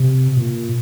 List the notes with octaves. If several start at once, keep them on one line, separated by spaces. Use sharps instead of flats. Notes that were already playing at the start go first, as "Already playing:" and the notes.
Already playing: C3
A#2